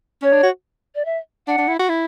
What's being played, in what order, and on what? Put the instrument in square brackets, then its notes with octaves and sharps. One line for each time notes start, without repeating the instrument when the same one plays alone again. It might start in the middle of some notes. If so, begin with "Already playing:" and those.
[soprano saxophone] C#4 [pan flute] C#5
[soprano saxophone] D4
F#4
[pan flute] D5
E5
[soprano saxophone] D4 [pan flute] F#5
[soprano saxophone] D4
E4
F#4
E4